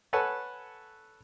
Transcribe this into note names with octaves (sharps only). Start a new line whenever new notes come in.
A4 B4 C#5 F#5 G#5 A5